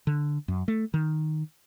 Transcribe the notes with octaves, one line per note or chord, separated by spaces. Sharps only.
D3
F#2
A3
D#3